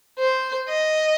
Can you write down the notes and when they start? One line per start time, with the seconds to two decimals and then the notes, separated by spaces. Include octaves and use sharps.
0.19 C5
0.69 D#5